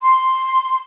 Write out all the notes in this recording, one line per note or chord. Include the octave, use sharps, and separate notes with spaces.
C6